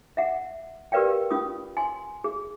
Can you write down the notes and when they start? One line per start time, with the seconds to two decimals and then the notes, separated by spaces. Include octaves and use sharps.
0.17 E5 F#5
0.92 G4 A#4 B4 D5 F5 G5
1.30 C#4 F4 D#6
1.77 G#5 C6
2.24 G#4